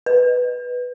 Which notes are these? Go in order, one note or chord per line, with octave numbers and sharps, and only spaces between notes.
B4